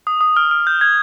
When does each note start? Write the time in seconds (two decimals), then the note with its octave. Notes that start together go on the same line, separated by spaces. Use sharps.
0.07 D#6
0.21 D#6
0.37 F6
0.51 F6
0.67 G6
0.81 G#6